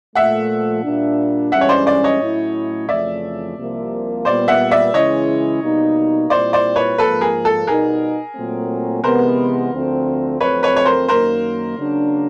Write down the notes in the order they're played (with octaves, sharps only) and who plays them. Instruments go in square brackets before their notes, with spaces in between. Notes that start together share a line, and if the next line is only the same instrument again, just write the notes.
[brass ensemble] A#2 F3 A3 [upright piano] E5 F#5
[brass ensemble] A#2 G3 A#3 D4
[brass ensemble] G2 E3 G#3 C#4 [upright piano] E5 F#5
[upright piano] C#5
C5 D5
C5 D5
C#5 D#5
[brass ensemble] A2 F#3 A3 C#4 E4
[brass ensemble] F2 C#3 E3 A3 [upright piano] D5 E5
[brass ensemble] C2 C3 F3 A#3
[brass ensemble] A#2 G3 B3 [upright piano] C5 D5
[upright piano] E5 F#5
D5 E5
[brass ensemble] C#3 E3 G#3 C#4 E4 [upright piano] C#5 D#5
[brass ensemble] B2 G3 A#3 D#4
[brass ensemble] A#2 G3 C4 E4 [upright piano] C5 D5
[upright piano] C5 D5
B4 C#5
[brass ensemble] G#2 F3 A#3 [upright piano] A4 B4
[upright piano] G#4 A#4
A4
[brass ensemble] B2 G3 B3 D#4 [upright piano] G#4 A#4
[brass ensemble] A#2 F#3 A3 C4
[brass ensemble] C3 E3 G#3 B3 [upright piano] A#4 C5
[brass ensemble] D2 D3 F3 A3 C4
[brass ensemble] F2 D3 F#3 A3 C4 [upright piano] B4 C#5
[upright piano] B4 C#5
C#5
A#4 C5
[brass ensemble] F#2 D#3 F#3 A#3 D#4 [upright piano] A#4 C5
[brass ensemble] C#3 F#3 A#3 D4